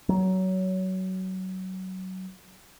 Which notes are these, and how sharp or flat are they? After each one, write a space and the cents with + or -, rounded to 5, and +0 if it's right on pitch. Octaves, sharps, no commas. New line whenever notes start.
F#3 +20